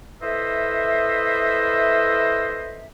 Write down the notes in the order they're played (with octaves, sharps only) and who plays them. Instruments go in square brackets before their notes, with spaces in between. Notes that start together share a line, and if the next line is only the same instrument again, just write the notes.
[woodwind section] E4 A4 B4 C5 D#5 E5